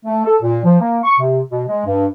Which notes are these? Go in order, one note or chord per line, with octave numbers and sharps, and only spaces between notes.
A3
A4
A#2
F3
A#3
C#6
C3
B2
G#3
G2